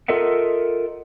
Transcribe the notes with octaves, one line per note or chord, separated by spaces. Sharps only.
F4 A4 A#4 D#5 E5 F#5